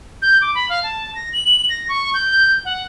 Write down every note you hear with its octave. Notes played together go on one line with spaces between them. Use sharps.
G6
D6
B5
F5
A5
A#6
F#7
A#6
C#6
G6
F#5